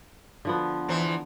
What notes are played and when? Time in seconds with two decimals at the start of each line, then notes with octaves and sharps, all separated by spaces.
0.45 D3 F3 B3
0.88 E2 E3 C5